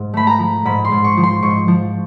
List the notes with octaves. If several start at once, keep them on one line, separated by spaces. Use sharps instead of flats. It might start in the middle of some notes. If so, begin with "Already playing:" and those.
Already playing: G#2
A3 B5
A#5
F3
G#2 B5
C6
G#2
C#6
F3
C6
G#2 C#6
F3